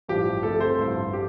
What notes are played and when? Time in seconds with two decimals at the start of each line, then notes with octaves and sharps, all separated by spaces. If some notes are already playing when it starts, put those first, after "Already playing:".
0.08 A1 G2 F3 D4 F4 G4
0.43 D2 D3 A3 C4 A4
0.60 C5
0.79 A1 G2 F3
1.13 G4